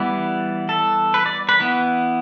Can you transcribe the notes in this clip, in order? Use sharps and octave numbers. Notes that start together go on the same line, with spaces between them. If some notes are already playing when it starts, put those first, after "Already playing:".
Already playing: E3 G3 B3 D5
A4
B4
D5
B4
E3 B3